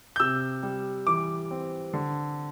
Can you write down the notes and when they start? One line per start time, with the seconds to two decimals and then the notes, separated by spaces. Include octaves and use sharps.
0.16 G6
0.20 C3 E6
0.63 G3
1.07 E3 D6
1.51 C4
1.93 D3